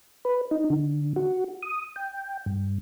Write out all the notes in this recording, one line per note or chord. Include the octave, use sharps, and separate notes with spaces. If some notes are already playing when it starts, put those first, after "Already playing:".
B4
D#4
D3
F#4
D#6
G5
G2